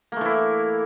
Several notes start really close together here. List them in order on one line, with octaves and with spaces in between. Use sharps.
A#3 A3 E3 E4